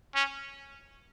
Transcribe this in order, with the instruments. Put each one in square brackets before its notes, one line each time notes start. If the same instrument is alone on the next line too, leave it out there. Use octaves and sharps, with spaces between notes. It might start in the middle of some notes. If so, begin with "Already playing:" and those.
[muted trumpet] C#4